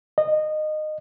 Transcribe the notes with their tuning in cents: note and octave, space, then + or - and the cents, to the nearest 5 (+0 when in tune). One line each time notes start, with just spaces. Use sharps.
D#5 -20